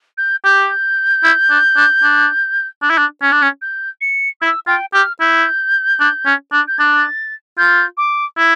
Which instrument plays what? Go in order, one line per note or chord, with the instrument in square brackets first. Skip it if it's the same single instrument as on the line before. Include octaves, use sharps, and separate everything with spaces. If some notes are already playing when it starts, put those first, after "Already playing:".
[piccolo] G6
[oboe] G4 [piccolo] G6
[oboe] E4
D4
D4
D4
D4
E4
D4
C#4
D4
C#4
[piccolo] G6
C#7
[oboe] E4 [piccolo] E6
[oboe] F4 [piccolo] G5
[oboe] G4 [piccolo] F6
[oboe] E4 [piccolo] G6
[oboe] D4
C#4
D4
[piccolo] G6
[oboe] D4 [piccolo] A6
[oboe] F4 [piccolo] G6
[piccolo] D6
[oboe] E4